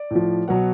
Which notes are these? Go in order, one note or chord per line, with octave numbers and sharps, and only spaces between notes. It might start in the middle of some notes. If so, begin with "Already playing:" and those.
Already playing: D5
A2 F3
B2 F#3 F#5